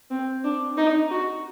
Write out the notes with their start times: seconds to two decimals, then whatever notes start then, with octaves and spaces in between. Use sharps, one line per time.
0.10 C4
0.44 D4
0.77 D#4
1.10 F#4